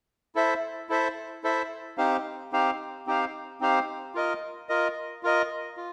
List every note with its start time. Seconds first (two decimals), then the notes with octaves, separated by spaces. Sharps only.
0.35 E4 A4 C5 E5
0.89 E4 A4 C5 E5
1.44 E4 A4 C5 E5
1.98 C4 D#4 G4 C5 F5
2.52 C4 D#4 G4 C5 F5
3.06 C4 D#4 G4 C5 F5
3.61 C4 D#4 G4 C5 F5
4.15 F4 A#4 D#5
4.69 F4 A#4 D#5
5.23 F4 A#4 D#5
5.77 F4